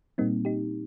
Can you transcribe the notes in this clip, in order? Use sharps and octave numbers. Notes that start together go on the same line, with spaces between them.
A#2 G3 A#3 C4 D#4
D#4 G4